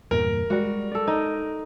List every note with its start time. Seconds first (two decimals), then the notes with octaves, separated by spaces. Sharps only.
0.11 E2 G2 A#2 A#4
0.50 G3 G#3 F#4
0.91 A4 D5
1.07 D#4